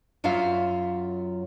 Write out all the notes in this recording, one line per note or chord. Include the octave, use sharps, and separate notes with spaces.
F#2 F#3 F4 E5 F5